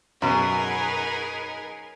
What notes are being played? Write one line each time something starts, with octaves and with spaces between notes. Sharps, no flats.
F#2 B2 F#3 D#4 G#4 A#4 B4